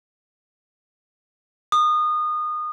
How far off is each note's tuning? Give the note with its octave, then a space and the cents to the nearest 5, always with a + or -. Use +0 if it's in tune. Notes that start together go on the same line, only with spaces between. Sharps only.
D#6 -25